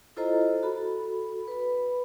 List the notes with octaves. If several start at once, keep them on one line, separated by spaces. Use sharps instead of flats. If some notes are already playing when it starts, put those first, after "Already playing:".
E4 F4 A4 C5 D#5 A#5
F#4 A4 B5
B4 B5